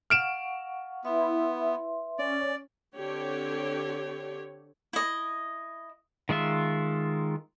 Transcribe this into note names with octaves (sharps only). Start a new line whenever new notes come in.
F5 F#5 C#6 F6 D7 E7
B3 E4 B4 E5 C6
C#4 D5
D3 C4 G4 C#5
E4 D#5
D#3 G#3 F4 E5